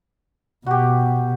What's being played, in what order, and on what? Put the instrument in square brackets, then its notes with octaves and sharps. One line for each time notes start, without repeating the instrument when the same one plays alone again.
[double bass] B2 [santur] F#4 G4